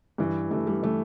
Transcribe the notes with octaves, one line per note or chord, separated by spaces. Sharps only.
G2 E3
G2 E3 A3
G3
E3 A3